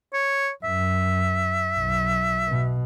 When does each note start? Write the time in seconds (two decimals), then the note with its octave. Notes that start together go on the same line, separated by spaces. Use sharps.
0.14 C#5
0.64 F#2 E5
1.77 B1
2.48 B2